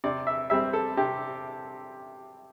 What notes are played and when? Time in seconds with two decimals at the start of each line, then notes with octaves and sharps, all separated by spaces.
0.04 C3 D5
0.27 E5
0.50 G3 C4 E5
0.73 A4
0.97 C3 G4